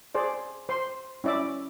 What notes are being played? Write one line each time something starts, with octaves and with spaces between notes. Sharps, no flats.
G#4 C5 D5
C5 C6
C#4 E4 D5 E5 D6